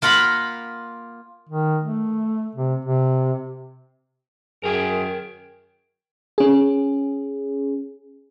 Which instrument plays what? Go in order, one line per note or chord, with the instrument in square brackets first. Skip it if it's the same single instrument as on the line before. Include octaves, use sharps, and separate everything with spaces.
[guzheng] A#3 F4 F#5 A#5 B5
[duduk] D#3
A3
C3
C3
[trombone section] F#2 G#4 [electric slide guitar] A#4 G5 G#5
[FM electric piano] C#4 G#4